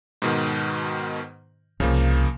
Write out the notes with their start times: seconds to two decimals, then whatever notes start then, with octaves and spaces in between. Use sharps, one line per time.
0.22 G#2 B2 D#3
1.80 C2 C#3 F3 A#3